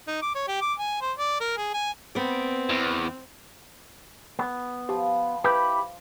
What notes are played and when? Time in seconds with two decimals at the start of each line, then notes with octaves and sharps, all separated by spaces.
0.07 D#4
0.22 D6
0.35 C#5
0.48 G4
0.61 D6
0.79 G#5
1.01 C5
1.18 D5
1.40 A#4
1.57 G#4
1.74 G#5
2.15 B3 C4 D5
2.70 E2
4.39 B3
4.89 F3 G4
5.44 E4 G4 B4 B5 G6